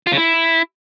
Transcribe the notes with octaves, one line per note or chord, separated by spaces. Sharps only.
F4
C#3
E4